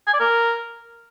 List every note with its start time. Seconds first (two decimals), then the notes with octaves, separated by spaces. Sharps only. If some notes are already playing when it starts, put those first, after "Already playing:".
0.07 G#5
0.13 D5
0.20 A#4